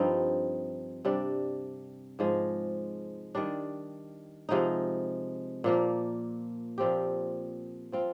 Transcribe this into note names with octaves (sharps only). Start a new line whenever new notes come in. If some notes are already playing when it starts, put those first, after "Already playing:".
Already playing: G2 F3 C4 D#4
C3 G3 D4
G#2 F3 G#3
D#3 G3 D4
C3 F3 G#3 D#4
A#2 F3 A#3
A#2 F3 C4 G4
F3 C4 F4